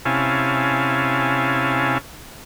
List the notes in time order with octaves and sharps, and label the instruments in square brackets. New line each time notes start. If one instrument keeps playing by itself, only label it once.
[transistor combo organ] C3 C#4 E4 F5 G#5 A5